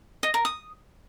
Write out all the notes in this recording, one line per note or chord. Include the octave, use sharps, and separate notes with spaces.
D#5
A#4
D#6